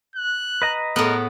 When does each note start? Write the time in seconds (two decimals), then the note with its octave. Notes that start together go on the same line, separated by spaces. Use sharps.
0.16 F#6
0.62 B4 D#5 A#5
0.96 A2 B3 A#4